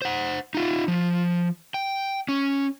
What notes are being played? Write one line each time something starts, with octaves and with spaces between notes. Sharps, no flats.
C5 F#5
D#4 F4
F3
G5
C#4